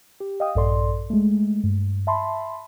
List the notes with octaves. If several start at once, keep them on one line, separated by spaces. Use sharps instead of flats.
G4
D#5 F5 G5 D#6
A#1 G2 A4 D5 C6
G#3 A3
G2
E5 A5 B5 C6